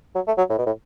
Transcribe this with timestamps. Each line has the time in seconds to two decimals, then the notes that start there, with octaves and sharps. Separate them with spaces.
0.15 F#3
0.27 A3
0.38 F#3
0.49 A2
0.58 B2
0.66 A2